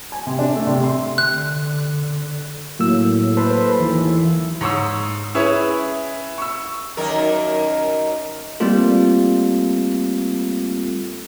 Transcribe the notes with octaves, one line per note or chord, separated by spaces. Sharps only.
G#5
C3
D4
A3
C3
C6
D3 F#6
A2 F#3 A#3 E6
A4 B4 C5
D#2 E3
G#2 C#5 C#6 D#6 E6
C#4 E4 G#4 B4 C#5 E5
C#6 E6
F#2 D#3 A#4
G3 A3 A#3 C4 F4 A4